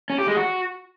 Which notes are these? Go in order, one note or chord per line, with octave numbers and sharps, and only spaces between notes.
C#4
G4
G#3
F#4